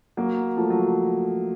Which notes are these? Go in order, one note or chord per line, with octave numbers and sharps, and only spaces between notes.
F#3 A#3
F3 A3
F#3